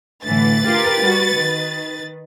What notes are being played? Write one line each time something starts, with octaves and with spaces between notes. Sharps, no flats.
A2 D3 E3 B4 A6
F4 G4 A#4
G3 F#4
D#3